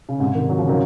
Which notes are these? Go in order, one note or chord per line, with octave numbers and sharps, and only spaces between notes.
C#3
G#2 C3
C3 D#3
D#3 F#3
C#3 F3
D#3 F#3